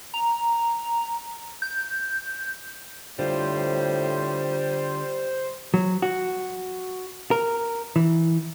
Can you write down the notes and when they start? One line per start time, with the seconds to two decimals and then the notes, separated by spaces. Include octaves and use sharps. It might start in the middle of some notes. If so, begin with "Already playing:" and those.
0.14 A#5
1.62 G6
3.19 A2 D3 G3 F4 C5
5.74 F#3
6.02 F#4
7.31 A#4
7.96 E3